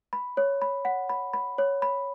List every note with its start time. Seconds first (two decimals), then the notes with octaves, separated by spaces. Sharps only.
0.13 B5
0.37 C#5
0.62 B5
0.85 F#5
1.09 B5
1.34 B5
1.58 C#5
1.82 B5